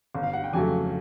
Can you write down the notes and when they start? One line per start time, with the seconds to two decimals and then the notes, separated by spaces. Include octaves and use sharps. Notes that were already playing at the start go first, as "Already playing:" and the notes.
0.15 G1
0.23 F5
0.33 F#5
0.44 G5
0.53 F2 C#3 F#3 A3 G#5